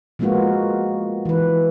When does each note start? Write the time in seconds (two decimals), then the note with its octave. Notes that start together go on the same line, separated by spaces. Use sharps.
0.19 F3 G#3 A#3 B3 F4 F#4
1.25 E3 B4